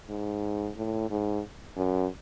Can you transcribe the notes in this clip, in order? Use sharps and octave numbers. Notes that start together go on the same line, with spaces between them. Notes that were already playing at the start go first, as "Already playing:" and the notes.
G#2
A2
G#2
F#2